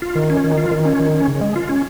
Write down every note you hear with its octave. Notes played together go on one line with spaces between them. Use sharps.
F4
D#3
C#4
D#3
F4
D#3
C#4
D#3
C#4
C#3
G#3
F4
C#4